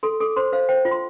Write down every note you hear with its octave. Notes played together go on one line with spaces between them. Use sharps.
A4 C6
A4 D6
C5 C6
C5 F5
C5 G5
F4
C6